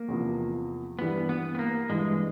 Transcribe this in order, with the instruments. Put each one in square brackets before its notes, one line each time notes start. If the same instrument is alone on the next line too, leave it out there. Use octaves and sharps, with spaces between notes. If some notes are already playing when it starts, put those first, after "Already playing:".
Already playing: [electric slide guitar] A#3
[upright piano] E2 C3 F3
[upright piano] G2 E3 G3 [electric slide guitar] B3
[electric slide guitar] B3
B3
A#3
[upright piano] G2 E3 G3 [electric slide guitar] G#3